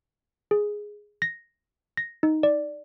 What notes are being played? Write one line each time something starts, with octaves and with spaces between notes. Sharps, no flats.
G#4
A#6
A#6
D#4
D5